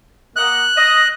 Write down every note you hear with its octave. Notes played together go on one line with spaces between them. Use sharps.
A#3 D#5 F#5 F#6
D#5